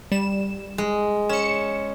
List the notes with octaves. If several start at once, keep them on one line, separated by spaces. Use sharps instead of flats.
G3 E7
G#3
C#4 C#7 E7